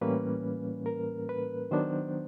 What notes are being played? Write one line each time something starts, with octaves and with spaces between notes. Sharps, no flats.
A2 E3 G3 A#3 C#4 B4
A#4
B4
D#3 F#3 B3 D4 C5